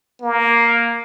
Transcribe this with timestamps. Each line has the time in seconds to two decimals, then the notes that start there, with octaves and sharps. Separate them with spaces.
0.22 A#3